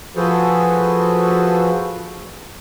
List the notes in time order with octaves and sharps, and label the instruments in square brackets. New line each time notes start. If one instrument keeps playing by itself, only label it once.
[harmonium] F3 F#4 G#4 A4 B4 C5